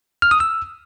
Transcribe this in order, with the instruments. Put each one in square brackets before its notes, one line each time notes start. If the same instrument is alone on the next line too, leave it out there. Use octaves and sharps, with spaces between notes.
[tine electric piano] F6
D#6
E6